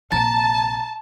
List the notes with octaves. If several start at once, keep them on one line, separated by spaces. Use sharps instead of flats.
A#1 C3 A5 A#5 A6